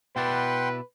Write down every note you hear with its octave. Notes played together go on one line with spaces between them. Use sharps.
B2 E4 B4 D5 F#5 G5 C6